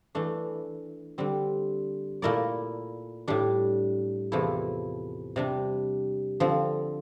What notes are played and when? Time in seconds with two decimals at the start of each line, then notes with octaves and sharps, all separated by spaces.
0.15 E3 A3 D4
1.18 D3 G3 C4
2.22 A#2 A3 E4 A#4 D5
3.28 A2 G3 D4
4.32 E2 C3 F3 A3 E4
5.36 C3 G3 D4
6.40 D3 F3 C4